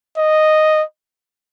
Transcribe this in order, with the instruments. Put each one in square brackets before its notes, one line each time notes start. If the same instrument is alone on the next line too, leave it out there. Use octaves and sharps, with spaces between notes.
[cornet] D#5